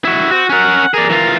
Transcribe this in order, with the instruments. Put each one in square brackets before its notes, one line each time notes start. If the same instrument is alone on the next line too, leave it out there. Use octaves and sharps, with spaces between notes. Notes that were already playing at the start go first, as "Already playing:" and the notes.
[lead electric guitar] E4 F#4
[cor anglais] C4 [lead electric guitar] F#4
[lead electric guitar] C#4 A#4 [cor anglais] F#5
[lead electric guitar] G#4 D5 [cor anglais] A#4
[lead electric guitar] E3 F4